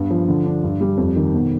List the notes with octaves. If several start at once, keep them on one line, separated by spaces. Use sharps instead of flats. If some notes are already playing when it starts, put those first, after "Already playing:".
Already playing: G2 B3
F3
D3
D4
G2
G3
F2
D#3
B2